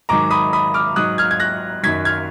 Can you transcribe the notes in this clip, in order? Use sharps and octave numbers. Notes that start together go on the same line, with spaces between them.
G#2 D#3 F#3 A#5 D6
B5 D#6
B5 D#6
D6 F6
G#2 F#3 D#6 F#6
F6 G#6
G#6
F#6 A#6
F#2 D#3 F#3 G#6 B6
F6 G#6